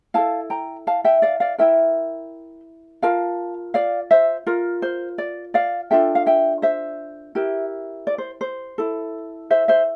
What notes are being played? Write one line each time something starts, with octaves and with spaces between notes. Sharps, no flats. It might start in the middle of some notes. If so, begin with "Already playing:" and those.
E4 A4 F5 A5
G5 A#5
F5 A5
E5 G5
D5 F5
D5 F5
E4 A#4 E5 G5
F4 A#4 F5 A5
D5 F5
C5 E5
F4 A#4
C5
D5
D5 F5
D4 F4 A4 E5 G5
F5
E5 G5
C5 E5
E4 G4 A#4
D5
C5
C5
E4 A4
C5 E5
C5 E5